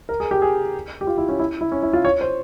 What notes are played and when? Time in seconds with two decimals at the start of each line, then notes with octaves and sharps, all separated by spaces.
0.09 A#4
0.20 G#4
0.31 G4
0.42 G#4
1.01 G4
1.07 F4
1.18 E4
1.29 C#4
1.39 E4
1.61 E4
1.72 C#4
1.83 E4
1.93 F4
2.05 C#5
2.21 C5